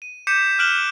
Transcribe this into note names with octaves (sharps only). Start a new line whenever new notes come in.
D#7
D6 G6 B6 C#7 D#7 E7
F6 F#6 D7 E7 F#7 G7